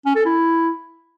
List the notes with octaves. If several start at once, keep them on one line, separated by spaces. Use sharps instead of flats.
C#4
A4
E4